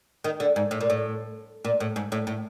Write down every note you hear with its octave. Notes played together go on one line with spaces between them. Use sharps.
D#3
D3
G#2
A2
A#2
A2
A#2
A2
G#2
A2
A2